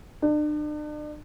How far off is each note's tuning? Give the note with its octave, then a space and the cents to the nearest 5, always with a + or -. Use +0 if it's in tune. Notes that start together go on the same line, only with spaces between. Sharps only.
D4 +40